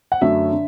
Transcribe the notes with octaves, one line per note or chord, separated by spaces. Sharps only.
F#5
F#2 D3 F#3 A3 E5
D3